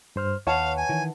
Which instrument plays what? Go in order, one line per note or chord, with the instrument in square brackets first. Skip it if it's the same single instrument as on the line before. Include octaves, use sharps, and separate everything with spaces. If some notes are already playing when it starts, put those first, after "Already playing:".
[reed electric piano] G2 C5 F6
[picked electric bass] D#2 [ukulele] B4 F#5 A5 [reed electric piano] C#5 [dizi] F5
[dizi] G#5
[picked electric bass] D#3 E3